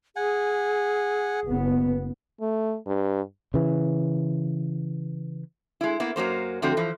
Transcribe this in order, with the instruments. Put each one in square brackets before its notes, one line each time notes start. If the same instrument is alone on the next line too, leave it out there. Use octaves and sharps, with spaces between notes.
[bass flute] G#4 [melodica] F#5 G#5
[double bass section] F#1 B3
[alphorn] A3
G2
[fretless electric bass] C#3 E3
[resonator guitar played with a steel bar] G#3 E4
A#3 B3 E4
F#2 F#3 A#3 C5
D3 F3 A3 C4 F#4
E3 F3